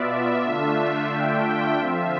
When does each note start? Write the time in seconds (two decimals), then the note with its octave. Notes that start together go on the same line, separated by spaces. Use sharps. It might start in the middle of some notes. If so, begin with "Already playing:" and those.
Already playing: B2 B3 F4 D5 E5
0.44 D3 A3 D4 F4 E5
1.12 G5
1.79 D3 F3 C4 F4 E5